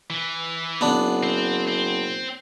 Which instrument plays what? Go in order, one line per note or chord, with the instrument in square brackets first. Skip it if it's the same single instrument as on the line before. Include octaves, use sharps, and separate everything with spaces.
[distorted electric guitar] E3
[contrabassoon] F#1 [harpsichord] B3 D4
[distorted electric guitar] C4
C4